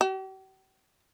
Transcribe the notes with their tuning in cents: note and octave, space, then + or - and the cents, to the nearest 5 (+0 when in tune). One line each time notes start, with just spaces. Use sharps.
G4 -45